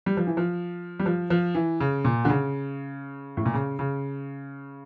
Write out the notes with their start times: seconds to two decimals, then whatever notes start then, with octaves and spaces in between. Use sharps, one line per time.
0.06 G3
0.17 F3
0.27 E3
0.37 F3
1.00 G3
1.06 F3
1.30 F3
1.55 E3
1.80 C#3
2.05 A#2
2.25 D3
2.30 C#3
3.37 A2
3.46 A#2
3.54 C#3
3.79 C#3